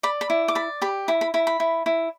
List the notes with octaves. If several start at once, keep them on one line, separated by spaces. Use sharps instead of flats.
D5 B5
B5
E4
D6
D5 B5
G4 B5
E4 B5
B5
E4 B5
B5
E4
E4